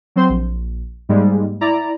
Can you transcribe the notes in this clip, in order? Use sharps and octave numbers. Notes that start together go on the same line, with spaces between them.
F#3 C4 C5 C6
A#1
G#2 G3 G#3 A#3
E4 D5 A#5